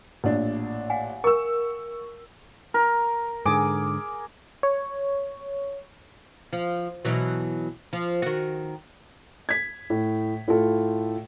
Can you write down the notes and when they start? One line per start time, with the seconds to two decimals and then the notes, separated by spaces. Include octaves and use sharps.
0.24 A1 A#2 D4
0.90 F5 F#5 G#5
1.24 A#4 C#6 E6
2.74 A#4
3.45 G#2 D3 G#4 D6
4.63 C#5
6.53 F3
7.05 B2 E3 F#3
7.93 F3
8.22 D#3 F#4
9.49 G#6 B6
9.90 A2
10.48 A2 F4 A4